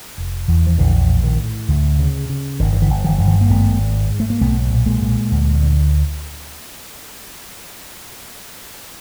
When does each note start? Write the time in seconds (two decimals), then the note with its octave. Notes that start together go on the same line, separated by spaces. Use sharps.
0.18 F1
0.48 E2
0.67 F3
0.78 A#1 D3 E3
1.09 A2
1.24 D#3
1.38 A2
1.68 D2
1.99 C#3
2.30 C#3
2.59 G1 D#3
2.73 D#3
2.82 D3 E3
2.89 G1
3.05 D#3 F3
3.18 G2 E3
3.27 D#3 F3
3.41 A#3
3.50 G#1 A3 B3
3.81 G#2
4.10 G#2
4.20 A3
4.30 A#3
4.41 B1 A3 B3
4.71 A#2
4.86 G#3 A#3
5.01 A#2
5.31 D2
5.62 D3